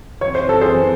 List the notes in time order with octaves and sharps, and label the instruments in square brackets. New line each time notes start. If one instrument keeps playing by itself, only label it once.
[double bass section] F#2 E3 C4 [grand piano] C#5
[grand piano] C5
A4
G#4 C5